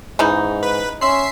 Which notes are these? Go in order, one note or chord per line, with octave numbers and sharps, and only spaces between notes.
G#2 C#3 E3 D#4
B4
C#4 E5 C6 C7